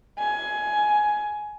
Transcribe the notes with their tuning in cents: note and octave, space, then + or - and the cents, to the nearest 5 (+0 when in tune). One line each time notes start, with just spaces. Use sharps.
G#5 +15